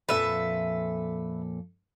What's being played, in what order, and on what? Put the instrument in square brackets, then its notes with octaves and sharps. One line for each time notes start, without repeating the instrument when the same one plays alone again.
[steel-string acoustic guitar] F2 A#2 A4 [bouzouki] B4 E5